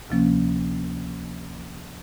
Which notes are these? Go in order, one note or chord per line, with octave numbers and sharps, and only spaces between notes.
D2 C3 F3 A#3 C#4